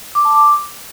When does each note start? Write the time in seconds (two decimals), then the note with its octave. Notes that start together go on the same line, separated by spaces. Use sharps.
0.15 D6
0.25 A5
0.35 D6